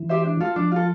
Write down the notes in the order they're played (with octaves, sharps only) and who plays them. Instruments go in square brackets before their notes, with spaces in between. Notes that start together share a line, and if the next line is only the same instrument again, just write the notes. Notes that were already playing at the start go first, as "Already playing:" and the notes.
Already playing: [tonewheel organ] E3
[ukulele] G4 C5 E5
D4
F4 A4
[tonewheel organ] F3 [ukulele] D4
[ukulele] F4 A4